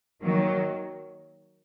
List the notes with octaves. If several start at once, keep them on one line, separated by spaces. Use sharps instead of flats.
D#3 F#3 A#3